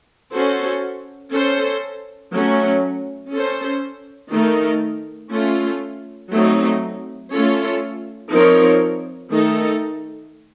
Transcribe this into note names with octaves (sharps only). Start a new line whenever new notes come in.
C#4 F#4 A4 C5
C#4 A4 C5
F#3 A3 C#4
C#4 A4 C5
D#3 A3 D#4 A#4
A3 C#4 F4
F#3 A3 C4 D#4
A3 C#4 F4 A4 C#5
F3 C4 D#4 A#4 C#5
D#3 A3 D#4 A4